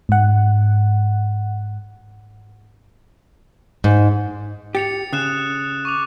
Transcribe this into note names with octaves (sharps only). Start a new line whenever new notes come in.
G#2 F#5
G#2
G4 A6 C#7 F7
C#3 D#6 F#6 E7
C#6 D6 F7